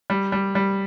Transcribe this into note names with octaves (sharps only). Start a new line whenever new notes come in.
G3
G3
G3